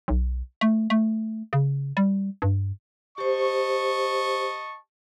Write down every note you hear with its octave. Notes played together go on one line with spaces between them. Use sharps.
B1
A3
A3
C#3
G3
G2
G4 C5 D#5 A5 C#6